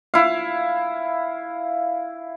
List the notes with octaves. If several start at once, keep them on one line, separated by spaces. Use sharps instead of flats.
E4 F5